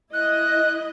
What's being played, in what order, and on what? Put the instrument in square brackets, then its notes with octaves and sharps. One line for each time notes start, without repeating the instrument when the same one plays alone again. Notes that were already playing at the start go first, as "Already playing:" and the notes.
[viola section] E4 D#5 [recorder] F#6